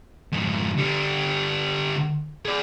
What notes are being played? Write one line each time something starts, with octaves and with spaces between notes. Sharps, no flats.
F2 G#2
D3 G3
G#4 D5